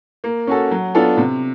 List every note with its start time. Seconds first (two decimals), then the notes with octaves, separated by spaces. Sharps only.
0.24 A#3
0.47 C#4 F#4 A4
0.71 F#3
0.95 B3 D4 F4 A4
1.17 C3